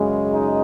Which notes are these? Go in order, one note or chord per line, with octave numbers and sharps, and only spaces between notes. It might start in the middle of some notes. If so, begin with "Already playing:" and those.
Already playing: F#2 C#3 G#3
D#4